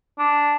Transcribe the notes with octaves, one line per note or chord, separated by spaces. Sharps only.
D4